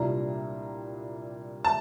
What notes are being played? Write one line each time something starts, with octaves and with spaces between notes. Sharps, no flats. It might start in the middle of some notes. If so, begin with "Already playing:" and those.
Already playing: C2 A#2 G3 D4 A#5
A5